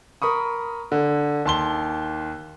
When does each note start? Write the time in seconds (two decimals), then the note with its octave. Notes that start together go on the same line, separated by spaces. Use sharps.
0.22 A#4 B5 C#6 D#6
0.92 D3
1.46 D#2 A5 C6 G7